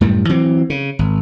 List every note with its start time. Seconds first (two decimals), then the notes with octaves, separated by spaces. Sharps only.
0.01 F#2 A2 G3
0.29 E3 F#3 C4
0.70 C#3
0.99 G#1